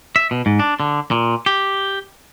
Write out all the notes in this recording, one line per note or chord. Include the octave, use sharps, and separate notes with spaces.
E5
B2
G#2
D4
D3
A#2
G4